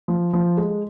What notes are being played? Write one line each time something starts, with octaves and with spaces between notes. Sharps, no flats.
F3
F3
G#3